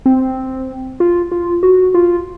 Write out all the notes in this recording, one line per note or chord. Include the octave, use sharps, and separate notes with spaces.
C4
F4
F4
F#4
F4